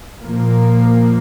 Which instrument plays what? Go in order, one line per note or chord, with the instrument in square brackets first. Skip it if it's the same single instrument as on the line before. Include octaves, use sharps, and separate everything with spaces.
[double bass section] A#2 F3 A#3